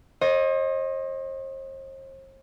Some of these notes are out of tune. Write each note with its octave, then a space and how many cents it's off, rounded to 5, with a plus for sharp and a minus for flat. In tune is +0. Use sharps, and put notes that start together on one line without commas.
C5 +45 D#5 +0